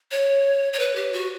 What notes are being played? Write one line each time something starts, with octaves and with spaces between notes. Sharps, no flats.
C#5
C#5
B4
G4
F#4